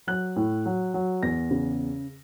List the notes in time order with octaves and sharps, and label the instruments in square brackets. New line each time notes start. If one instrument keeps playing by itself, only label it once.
[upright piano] F#3 F#6
A2
F#3
F#3
E2 A#6
C#3